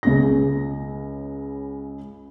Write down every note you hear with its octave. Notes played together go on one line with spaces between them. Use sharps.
C#2 C#3 A#6